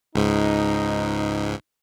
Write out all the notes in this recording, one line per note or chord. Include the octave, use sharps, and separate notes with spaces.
C#2 G#2 D#4